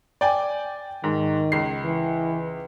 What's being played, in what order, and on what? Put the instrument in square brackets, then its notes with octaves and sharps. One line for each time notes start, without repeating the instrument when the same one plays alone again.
[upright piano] D5 G5 G#5
[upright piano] G#2 [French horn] D#3
[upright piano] C#2 C7
[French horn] E3